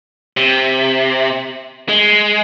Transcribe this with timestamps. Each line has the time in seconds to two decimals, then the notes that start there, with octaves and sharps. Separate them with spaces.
0.37 C3
1.89 G#3